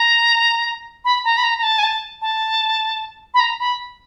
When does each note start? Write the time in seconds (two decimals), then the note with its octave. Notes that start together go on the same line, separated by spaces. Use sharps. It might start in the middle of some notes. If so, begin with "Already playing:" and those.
Already playing: A#5
1.05 B5
1.24 A#5
1.37 B5
1.44 A#5
1.58 A#5
1.63 A5
1.79 G#5
1.83 A5
2.22 A5
3.34 B5
3.40 A#5
3.59 B5